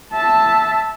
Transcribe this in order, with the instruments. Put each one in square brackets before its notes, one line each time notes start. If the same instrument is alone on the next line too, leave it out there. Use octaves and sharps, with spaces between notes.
[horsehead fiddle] E5 A5